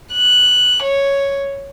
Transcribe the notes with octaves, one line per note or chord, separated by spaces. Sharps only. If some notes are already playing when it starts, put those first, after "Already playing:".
F#6
C#5